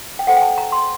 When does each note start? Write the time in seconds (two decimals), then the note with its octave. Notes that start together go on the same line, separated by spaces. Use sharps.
0.19 G5
0.27 F#4 A4 C5 F#5
0.37 G5
0.42 A5
0.58 A#5
0.72 C6